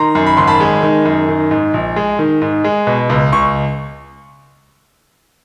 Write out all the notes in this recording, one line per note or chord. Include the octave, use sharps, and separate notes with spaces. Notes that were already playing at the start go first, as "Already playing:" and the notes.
Already playing: D#3 A#5 C6
F#2
B5
G#1 C6
A5 B5
G#3
D#3
F#2
D#3
G#2
A#1
G#3
D#3
G#2
G#3
B2
C#2
C#2 C#6